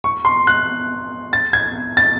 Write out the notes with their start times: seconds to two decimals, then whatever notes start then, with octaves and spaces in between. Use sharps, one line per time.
0.04 C#6
0.25 C6
0.47 F#6
1.33 A6
1.53 G#6
1.97 A6